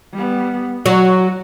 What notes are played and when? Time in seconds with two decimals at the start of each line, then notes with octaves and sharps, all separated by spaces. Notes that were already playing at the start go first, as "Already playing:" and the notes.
0.14 G3 B3
0.86 F#3 F#4